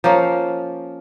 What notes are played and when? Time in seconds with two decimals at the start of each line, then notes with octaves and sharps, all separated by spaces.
0.04 F3 A#3 C#4